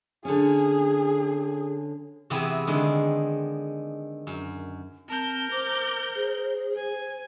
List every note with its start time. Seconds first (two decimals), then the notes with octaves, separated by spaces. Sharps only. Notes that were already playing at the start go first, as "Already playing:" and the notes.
0.25 D3 C#4 G#4
2.30 C3 E3 B3 C4 G#4
2.67 D3 D#3 G#3
4.27 F#2
5.09 C4 A#4 A5 G6
5.51 C5 D6
6.15 G#4
6.76 G#5